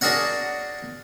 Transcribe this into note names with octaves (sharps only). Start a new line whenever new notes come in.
D4 F#4 G#4 A#4 C#5 F#5